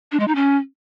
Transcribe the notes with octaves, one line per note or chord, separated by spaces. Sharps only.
D4
G#3
D#4
C#4